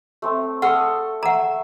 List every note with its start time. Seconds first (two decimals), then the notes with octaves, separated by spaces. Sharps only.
0.22 A3 C4
0.62 A4 F#5 C#6 D#6 F6
1.23 E5 F#5 A#5